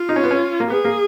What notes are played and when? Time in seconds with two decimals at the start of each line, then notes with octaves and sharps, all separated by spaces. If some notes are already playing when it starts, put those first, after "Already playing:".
Already playing: F4
0.09 D#4
0.16 C#4
0.24 B3
0.31 C#4
0.60 A#3
0.70 B3 G#4
0.85 A#3